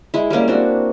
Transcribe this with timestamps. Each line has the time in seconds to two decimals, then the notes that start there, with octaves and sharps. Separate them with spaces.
0.14 G#3 E4
0.30 G3 G#3 A#3 C#4
0.48 C4 D4 F#4